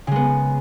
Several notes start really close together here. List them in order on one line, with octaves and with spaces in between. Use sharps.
C#3 G#3 B3